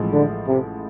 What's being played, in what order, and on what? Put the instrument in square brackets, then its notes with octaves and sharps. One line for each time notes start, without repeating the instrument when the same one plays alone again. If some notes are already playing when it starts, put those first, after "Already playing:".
Already playing: [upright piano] A1 A2 F3 G#3
[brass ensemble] D3
C3